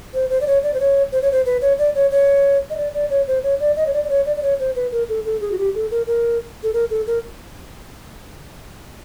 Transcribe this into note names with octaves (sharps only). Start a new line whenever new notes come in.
C5
C5
D5
C#5
D5
C5
C#5
C5
C#5
C5
B4
C#5
D5
C#5
C#5
D#5
D5
D5
C#5
C5
C#5
D5
D#5
C#5
D5
D5
C#5
D5
D5
C#5
C5
B4
A#4
A4
A4
G#4
F#4
G4
A4
A#4
A#4
A4
A#4
A4
A#4